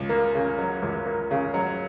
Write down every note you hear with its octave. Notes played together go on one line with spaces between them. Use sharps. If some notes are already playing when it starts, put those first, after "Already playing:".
Already playing: C#2
A#3
C#3
F#3
C#2
A#3
C#3
F#3